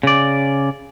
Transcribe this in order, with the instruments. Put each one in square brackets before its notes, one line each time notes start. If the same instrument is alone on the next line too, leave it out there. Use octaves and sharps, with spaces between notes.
[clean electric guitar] C#3 D5